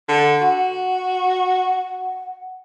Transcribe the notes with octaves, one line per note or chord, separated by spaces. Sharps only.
D3
F#4 F#5